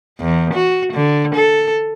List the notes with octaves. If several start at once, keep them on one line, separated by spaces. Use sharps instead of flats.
E2
F#4
D3
A4